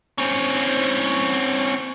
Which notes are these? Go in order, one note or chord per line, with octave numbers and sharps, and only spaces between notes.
C4 C#4